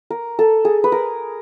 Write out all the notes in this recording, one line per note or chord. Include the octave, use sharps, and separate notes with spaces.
A#4
A4
G#4
B4
A#4